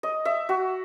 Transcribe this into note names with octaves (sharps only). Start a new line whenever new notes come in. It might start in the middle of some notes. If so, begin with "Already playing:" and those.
D#5
E5
F#4